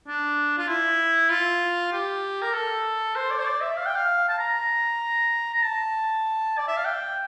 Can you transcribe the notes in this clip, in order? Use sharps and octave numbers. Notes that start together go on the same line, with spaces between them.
D4
F4
E4
F4
G4
A#4
A4
C5
D5
C5
D5
E5
F5
G5
F5
A5
A#5
A#5
A5
D5
E5
F5
G5